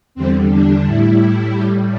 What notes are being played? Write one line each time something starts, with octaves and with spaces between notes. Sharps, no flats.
E2 D3 G3 C4
D4
A2 G3 E4
A2 G3 G4